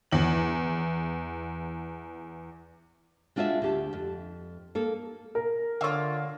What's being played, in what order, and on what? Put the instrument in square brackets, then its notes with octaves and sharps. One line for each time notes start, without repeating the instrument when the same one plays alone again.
[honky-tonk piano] E2 F#7
[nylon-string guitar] G#3 D4 F4 F#4 D#5 E5
D2 G4 A5
F2
A#3 A4
[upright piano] A#4
[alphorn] D3 [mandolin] A#3 F4 [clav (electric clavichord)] C#5 E5 F5